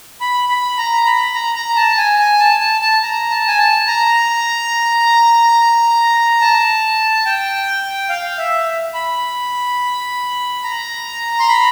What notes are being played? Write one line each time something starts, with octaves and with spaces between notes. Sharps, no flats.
B5
B5
A#5
B5
A#5
A#5
A5
G#5
G#5
A5
A5
A5
A#5
A5
G#5
A5
A#5
A5
G5
F5
E5
B5
A#5
C6
B5